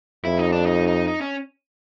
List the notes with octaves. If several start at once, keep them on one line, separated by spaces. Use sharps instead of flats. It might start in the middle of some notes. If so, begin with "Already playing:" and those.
F2 E4
D#4
D4
D#4
D#4
D#4
C#4